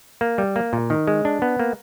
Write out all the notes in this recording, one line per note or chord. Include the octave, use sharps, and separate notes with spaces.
A#3
G3
A#3
A#2
D#3
G#3
D4
B3
A#3